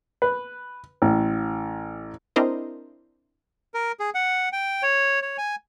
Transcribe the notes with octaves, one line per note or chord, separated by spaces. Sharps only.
B4
A1
C4 D4 E4 A#4 C5 D#5
A#4
G#4
F#5
G5
C#5
C#5
G#5